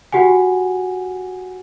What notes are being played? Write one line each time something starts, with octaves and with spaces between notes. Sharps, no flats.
F#4 G4 F#5 G#5